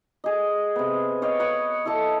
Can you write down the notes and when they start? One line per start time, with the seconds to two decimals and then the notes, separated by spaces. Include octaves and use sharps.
0.24 G#4 D#5
0.76 C3 B3
1.22 C#5 D#5 F5 G5
1.40 B4 C#5 F#5
1.85 E4 A4 D#5 A5